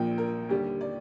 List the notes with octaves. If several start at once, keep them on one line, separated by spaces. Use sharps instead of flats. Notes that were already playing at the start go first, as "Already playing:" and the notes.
Already playing: A#1 A#2 F3 G5
A#4
D#2 D3 G3 G4
D5